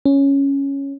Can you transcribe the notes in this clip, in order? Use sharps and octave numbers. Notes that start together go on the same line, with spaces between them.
C#4